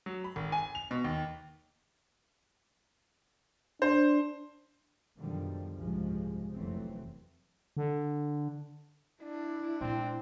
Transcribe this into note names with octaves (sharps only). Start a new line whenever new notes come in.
F#3
B5
G#1
G#5
F7
B2
D#2
D4 C5
F#2 B2 D3 D#3 F3 G3
C2 G#2 C#3 F3 G#3
F1 E3 F#3 A3 C4
D3
D4 E4
A#2 G#3 C4